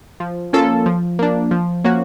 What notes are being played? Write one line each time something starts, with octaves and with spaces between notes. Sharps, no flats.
F3
A#3 C#4 F4 A4
F3
A#3 D4
F3
A#3 C#4 F#4